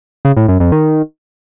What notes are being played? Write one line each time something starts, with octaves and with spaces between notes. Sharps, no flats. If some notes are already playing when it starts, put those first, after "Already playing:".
C#3
A2
F#2
F2
D#3